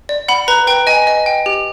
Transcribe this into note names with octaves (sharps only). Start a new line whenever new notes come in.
D5
F#5 B5
B4 A#5
B4 G5
D#5 G#5
D#5
G5
G4